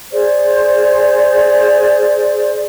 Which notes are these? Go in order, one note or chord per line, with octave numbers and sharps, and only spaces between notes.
G#4 C5 D5